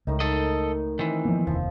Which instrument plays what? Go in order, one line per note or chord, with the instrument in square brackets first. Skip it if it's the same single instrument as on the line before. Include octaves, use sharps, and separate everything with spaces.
[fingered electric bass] C#2 [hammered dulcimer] A2 D#3 D#4
[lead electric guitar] A4 D#5
[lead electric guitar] D#3 E3 [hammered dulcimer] C4
[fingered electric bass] F3 A#3 B3
[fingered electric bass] F1 D#2 [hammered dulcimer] F3